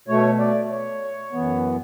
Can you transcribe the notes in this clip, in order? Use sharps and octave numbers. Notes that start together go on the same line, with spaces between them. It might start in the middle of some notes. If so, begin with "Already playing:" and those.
B2 A3 C#5
D5
C#5
F#2 E3 B3